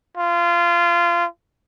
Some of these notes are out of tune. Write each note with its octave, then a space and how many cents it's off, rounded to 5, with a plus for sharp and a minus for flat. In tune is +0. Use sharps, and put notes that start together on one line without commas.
F4 -25